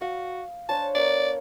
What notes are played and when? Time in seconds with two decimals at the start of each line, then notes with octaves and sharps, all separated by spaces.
0.01 F#4 F5
0.69 D4 C5 C#5 A5
0.95 B3 A#4 D5